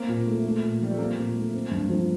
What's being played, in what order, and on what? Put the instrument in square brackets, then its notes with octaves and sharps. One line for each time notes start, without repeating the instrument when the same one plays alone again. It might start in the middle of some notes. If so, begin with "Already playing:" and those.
Already playing: [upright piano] A#3 [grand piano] C4
[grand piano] A#2
A3
A3
A#2
[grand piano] F3 [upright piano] G3
[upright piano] A3
[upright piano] A#3 [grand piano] C4
[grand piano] A#2
A3
C4
G2
F3